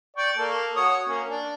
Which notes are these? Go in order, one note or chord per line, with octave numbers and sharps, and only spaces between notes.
D5 G5 C#6
A#3 A4
F#4 C#5 D#6
A#3 C#4
D4